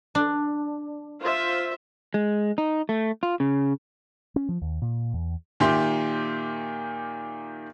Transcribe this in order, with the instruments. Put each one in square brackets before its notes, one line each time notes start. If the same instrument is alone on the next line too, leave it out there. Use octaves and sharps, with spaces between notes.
[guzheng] D4
[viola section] F4 C5 E5
[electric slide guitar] G#3
D#4
A3
F4
C#3
[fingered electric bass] C#4
F3
D#2
A#2
E2
[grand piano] A#2 D#3 G4 E5 C6